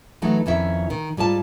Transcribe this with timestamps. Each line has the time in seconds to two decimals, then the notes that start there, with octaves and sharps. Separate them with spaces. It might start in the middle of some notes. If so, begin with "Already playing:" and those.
0.22 E3 F#3 A3 D#4
0.46 F2 D#3 C#4 E4 E5
0.90 D#3
1.17 G#2 G3 F4 A5